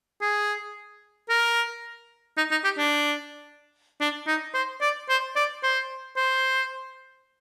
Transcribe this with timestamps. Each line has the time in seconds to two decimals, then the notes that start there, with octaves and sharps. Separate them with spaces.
0.21 G#4
1.29 A#4
2.37 D#4
2.51 D#4
2.64 G4
2.78 D4
4.00 D4
4.27 D#4
4.54 C5
4.81 D5
5.09 C5
5.36 D5
5.63 C5
6.17 C5